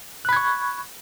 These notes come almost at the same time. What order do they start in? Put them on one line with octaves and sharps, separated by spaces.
F#6 B5 G#6 C#6